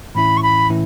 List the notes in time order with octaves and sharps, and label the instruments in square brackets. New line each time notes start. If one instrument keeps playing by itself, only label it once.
[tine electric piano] A2 E3 C#4 E4 [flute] B5
[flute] C#6
B5
[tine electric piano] A2 E3 C#4 E4